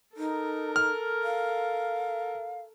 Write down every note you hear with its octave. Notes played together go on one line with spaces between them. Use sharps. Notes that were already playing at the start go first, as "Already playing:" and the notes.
D#4 A4 A#4
F6
F5